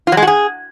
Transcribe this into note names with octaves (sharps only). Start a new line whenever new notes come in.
F4
F#3
G#3
F#4
G#4